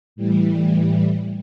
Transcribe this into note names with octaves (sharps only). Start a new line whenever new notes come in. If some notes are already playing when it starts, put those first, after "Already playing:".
A2 E3 G3